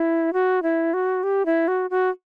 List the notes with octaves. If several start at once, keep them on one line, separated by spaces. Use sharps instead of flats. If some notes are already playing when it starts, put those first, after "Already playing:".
Already playing: E4
F#4
E4
F#4
G4
E4
F#4
F#4